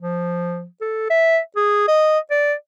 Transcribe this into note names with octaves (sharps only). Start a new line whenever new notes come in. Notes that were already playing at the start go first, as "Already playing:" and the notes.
F3
A4
E5
G#4
D#5
D5